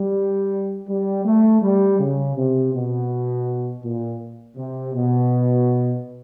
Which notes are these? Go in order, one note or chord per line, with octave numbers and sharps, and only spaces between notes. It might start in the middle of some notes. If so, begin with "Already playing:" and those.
Already playing: G3
G3
A3
G3
C#3
C3
B2
A#2
C3
B2